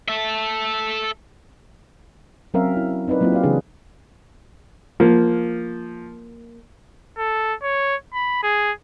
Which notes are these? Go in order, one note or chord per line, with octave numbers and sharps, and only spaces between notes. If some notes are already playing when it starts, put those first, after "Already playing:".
A4 E5
F#3 C4 C#4 A#4 E5 F5
E4
C4 D#4 A#4 B4 D5
F#3 A#3 C4 E4 F4
G4 D5 F5
C#3 E3 C#4 D4 G#4 B4
F3 A#3
A4
C#5
B5
G#4